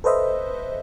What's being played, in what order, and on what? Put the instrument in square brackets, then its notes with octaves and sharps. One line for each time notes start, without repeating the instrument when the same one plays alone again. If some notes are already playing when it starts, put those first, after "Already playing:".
[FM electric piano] A4 B4 C5 D#5 E5